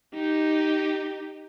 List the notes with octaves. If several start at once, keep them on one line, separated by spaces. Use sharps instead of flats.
D#4 G4